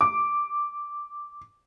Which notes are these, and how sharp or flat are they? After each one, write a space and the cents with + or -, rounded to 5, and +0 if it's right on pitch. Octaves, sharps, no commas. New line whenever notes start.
D6 +0